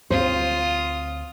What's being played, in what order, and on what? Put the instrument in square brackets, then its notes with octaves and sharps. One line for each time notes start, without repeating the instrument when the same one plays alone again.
[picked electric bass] D2 A#3 C4 [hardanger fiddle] F4 D#6 [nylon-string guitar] C5